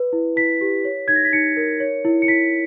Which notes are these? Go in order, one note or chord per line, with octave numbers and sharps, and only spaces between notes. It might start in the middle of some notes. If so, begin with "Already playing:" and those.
Already playing: B4
E4
E4 B6
G4
C#5
D#4 G#6
A#6
B6
D#4 C#7
A#4
C#5
E4
C#7
E4 B6